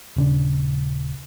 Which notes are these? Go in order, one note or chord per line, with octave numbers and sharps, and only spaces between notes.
D#1 C#3 D4